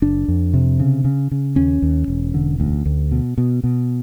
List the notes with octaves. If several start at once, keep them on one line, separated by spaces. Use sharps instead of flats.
F#1 D4
F2
C3
C#3
C#3
C#3
D#2 C#4
D#2
E1
D3
D2
D2
B2
B2
B2